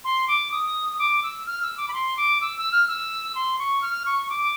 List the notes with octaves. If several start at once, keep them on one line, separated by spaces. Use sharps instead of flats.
C6
D6
D#6
D#6
D6
E6
F6
E6
D6
B5
C6
D6
E6
E6
F6
E6
C6
C#6
F6
C#6
D6